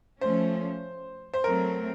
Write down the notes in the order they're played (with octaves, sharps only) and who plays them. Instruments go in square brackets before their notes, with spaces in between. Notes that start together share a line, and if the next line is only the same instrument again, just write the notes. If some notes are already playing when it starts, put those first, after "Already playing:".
[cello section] F3 A3 C#4 [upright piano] C5
[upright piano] C5
[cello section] F#3 A3 C4 [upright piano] A#4